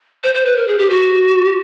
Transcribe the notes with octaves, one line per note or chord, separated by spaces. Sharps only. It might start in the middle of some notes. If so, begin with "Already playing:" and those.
C5
C5
B4
A#4
G#4
G4
F#4